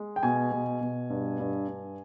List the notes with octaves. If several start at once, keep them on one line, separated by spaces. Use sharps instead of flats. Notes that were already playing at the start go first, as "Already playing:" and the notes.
Already playing: G#3
G5
B2 G#5
B2
B2
G2
G2
G2